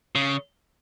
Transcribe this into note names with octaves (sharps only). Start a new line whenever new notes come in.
C#3